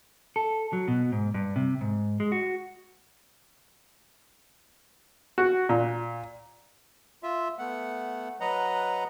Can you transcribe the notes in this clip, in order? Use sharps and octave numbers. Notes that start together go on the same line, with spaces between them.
A4
F#3
B2
G#2
G2
C3
G#2
G#3
F#4
F#4
A#2
F4 E5
A3 B3 F#5
F#3 B4 D#5 F#5 A#5